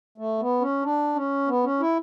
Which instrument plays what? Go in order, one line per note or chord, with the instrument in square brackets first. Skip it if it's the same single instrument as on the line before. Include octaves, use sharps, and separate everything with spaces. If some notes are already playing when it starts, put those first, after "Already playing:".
[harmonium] A3
B3
C#4
D4
C#4
B3
C#4
E4